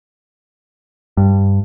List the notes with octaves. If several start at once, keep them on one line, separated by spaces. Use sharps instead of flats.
G2